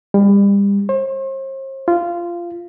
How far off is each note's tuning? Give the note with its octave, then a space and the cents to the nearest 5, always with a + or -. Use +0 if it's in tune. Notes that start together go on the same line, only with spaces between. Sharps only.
G3 +35
C5 +45
F4 -15